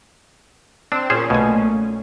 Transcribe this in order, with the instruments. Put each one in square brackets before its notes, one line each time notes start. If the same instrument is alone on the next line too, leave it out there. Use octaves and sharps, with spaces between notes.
[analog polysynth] C4 [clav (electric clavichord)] D4 [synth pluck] E7
[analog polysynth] A#2 C#4 [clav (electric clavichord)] G#4 C5
[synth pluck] B1 A3 F5 [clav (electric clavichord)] B2 G#5